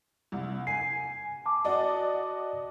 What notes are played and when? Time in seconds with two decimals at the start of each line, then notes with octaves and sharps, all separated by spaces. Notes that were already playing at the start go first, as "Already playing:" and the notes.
0.32 C2
0.67 G#5 C7
1.46 A5 D6
1.65 F#4 D5 D#5